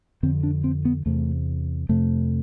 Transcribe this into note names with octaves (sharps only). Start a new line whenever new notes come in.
F2 D3 C4
D4
C4
B3
E2 C3 A3
F2 C3 A3